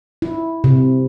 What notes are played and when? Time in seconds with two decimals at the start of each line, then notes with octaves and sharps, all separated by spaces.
0.22 E4
0.64 C3